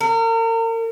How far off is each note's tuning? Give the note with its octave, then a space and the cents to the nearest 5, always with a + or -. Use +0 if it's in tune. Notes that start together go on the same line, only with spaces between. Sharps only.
A#4 -40